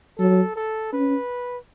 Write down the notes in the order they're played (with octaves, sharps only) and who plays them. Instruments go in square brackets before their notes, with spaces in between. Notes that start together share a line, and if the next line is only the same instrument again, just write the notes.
[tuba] F#3 [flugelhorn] A4
[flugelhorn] A4
[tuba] C#4 [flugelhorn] B4